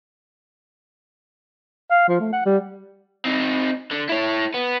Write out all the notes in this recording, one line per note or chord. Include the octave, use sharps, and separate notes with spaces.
F5
F3
A3
F#5
G3
C4 D#4
D3
E4 C#5
B3